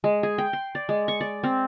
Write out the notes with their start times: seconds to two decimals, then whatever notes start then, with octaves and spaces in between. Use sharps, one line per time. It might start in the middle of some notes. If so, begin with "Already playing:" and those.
0.04 G#3
0.23 G#4
0.38 G5
0.53 C6
0.75 D5
0.89 G#3
1.08 C#6
1.21 D5
1.43 C4